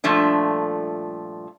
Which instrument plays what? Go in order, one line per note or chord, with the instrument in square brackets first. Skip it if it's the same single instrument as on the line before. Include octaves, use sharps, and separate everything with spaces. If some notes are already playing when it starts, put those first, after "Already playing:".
[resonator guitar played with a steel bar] G2 A#2 F3 A3 D4